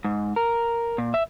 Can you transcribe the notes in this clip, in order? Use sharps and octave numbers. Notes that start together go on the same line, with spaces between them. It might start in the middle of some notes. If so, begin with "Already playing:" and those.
G#2
A#4
A#2
E5